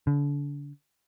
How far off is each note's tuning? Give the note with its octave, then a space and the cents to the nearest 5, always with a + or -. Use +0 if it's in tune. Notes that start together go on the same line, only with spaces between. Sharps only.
D3 -35